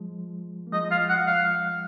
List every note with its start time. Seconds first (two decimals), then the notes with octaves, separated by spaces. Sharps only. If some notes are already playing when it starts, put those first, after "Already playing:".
Already playing: F3 G#3
0.67 A#3
0.72 F3 G#3 D#5
0.91 F5
1.09 F#5
1.27 F5